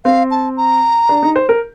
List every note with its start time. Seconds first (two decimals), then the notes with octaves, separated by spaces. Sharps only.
0.05 C4 F5
0.31 A5
0.57 A#5
1.09 D4
1.23 D#4
1.36 C5
1.49 A#4